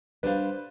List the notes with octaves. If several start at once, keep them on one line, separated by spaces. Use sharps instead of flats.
G3 D4 F4 B4 C5 F5